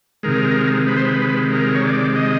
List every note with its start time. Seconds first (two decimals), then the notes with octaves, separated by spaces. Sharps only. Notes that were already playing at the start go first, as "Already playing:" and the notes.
0.23 C3 D#3 G#3 A#4
0.87 B4
0.96 C5
1.05 B4
1.52 A#4
1.75 C#5
1.84 D5
2.16 D#5